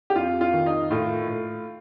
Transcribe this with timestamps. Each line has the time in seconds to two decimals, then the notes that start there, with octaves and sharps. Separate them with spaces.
0.10 G4
0.16 F2 F4
0.41 F4
0.53 D#3
0.66 D#4
0.91 A2 F4
1.28 A2